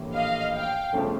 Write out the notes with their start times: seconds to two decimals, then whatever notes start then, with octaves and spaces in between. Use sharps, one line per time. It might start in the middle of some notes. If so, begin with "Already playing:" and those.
Already playing: A#1 A2 E3 G3 A#3
0.13 D#5 F5
0.53 F5 G5
0.93 G1 F2 C#3 F3 A3